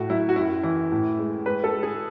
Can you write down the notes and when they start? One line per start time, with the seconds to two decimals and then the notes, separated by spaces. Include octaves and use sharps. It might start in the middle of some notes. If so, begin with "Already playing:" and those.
Already playing: A2 A3 F#4
0.10 F#3 E4
0.29 F#4
0.36 F#2 E4
0.64 E3 E4
0.92 A2
1.19 G#3
1.46 G#3 B4
1.64 A4
1.73 G#3
1.83 G#4